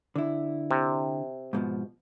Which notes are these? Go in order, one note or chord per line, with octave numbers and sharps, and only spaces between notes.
D3 E4
C3
G#2 B2 F3